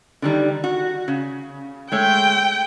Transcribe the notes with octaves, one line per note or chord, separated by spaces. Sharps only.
D3 D#3 G3
F#4
C#3
G#3 A3 C#5 G5